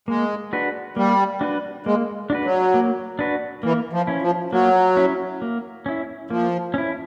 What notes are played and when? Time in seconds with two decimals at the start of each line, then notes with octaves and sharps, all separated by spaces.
0.08 G#3 A#3
0.53 D4 F#4 B4
0.96 G3 A#3
1.41 D4 F#4 B4
1.86 G#3 A#3
2.30 D4 F#4 B4
2.45 F#3
2.74 A#3
3.19 D4 F#4 B4
3.63 E3 A#3
3.93 F3
4.07 C#4 E4
4.22 F3
4.52 F#3 A#3
4.97 C#4 E4
5.42 A#3
5.86 C#4 E4
6.30 F3 A#3
6.74 C#4 E4